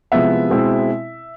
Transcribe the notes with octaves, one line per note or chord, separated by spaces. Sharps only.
C3 F3 G#3 B3 E4 E5
B2 G#3 C4 E4